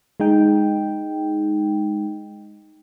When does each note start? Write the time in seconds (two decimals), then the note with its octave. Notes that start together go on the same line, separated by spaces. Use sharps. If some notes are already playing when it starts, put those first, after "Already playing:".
0.20 G#3 D#4 G5